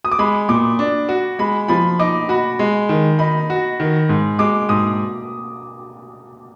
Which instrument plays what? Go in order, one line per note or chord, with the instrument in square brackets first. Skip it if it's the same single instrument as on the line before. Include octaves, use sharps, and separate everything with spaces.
[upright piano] D#6
D6
[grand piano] G#3 [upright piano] B5
[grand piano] A#2 [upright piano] D6
[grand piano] D4
F#4
[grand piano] G#3 [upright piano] B5
[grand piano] F3 [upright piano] B5
[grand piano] D#4 [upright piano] D6
[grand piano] F#4 [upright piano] B5
[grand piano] G#3
D#3
[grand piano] D#4 [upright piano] B5
[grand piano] F#4
D#3
G#2
[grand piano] G#3 [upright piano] D6
[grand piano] G#2 [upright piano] D#6